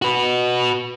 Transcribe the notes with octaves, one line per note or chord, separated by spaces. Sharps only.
F#4 B4